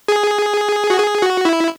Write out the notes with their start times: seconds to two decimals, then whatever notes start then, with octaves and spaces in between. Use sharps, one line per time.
0.08 G#4
0.90 F#4
1.00 G#4
1.22 F#4
1.45 E4